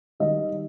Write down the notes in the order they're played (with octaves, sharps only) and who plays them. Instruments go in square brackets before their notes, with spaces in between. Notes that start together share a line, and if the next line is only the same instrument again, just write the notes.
[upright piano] D#3 G3 D#5